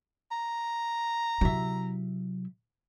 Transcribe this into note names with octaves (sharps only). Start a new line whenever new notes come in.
A#5
C3 F#3 E4 E5